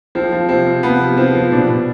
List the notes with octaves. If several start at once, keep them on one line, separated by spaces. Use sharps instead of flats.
F3 C4
F3
C3 C4
C3
F3 B3
C3
F3 C4
F3
B2 D4
B2